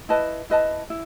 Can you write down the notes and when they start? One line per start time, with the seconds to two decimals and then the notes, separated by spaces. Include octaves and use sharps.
0.09 E4 B4 D#5 A5
0.50 E4 B4 D#5 A5
0.90 E4